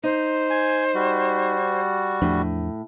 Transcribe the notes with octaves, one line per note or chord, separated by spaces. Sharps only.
D#4 C5
G#5
G3 F#4
E2 A2 F3 D4